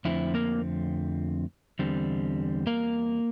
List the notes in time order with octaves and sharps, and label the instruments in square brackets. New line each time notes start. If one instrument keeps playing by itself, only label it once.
[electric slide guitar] F2 D3 F3 A3 C4 E4
A#3 A#4
E2 D3 G3 C4
A#3 A#4